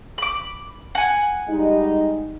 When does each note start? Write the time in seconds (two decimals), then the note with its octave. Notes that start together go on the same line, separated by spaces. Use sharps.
0.18 B5 D6
0.95 F#5 G#5
1.49 G3 G#3 D#4